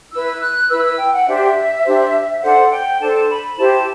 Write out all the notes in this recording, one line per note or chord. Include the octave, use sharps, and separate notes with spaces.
E4 B4 E6
F#6
E4 B4 E6
E6
G5
F#5
D4 G4 C5 E5
D4 G4 C5
D4 A4 C5 F#5
G5
D4 A4 C5 A5
B5
E4 G4 C5 A5